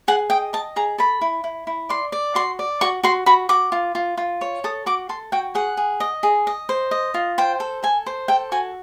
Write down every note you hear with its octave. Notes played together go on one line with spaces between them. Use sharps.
G#4 F#5
D#5 G5
D#5 A5
G#4 A#5
A4 B5
E4
E4
E4
D5 C6
D5
F#4 C6
D5
F#4 C#6
F#4 C6
F#4 B5
F#4 D6
F4
F4
F4
C#5
A4 D#6
F#4 D6
A4 C6
F#4 G5
G#4 F#5
G#4
D#5
G#4
D#5
C5
D#5
F4
C5 G5
A4
A4 G#5
C5
A4 G5
F#4 G#5